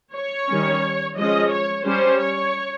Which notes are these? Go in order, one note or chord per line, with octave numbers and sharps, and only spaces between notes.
C#5
D#3 G3 C#4
F3 G#3 C#4 D#5
C#5
G3 C#4 C5
C#5